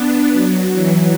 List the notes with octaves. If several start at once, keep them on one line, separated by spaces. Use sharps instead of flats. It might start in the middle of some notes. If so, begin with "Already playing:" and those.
Already playing: B3 D4
F#3
E3